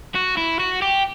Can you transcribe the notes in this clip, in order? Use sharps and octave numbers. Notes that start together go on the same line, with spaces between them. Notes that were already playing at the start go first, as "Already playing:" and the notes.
F#4
E4
F#4
G4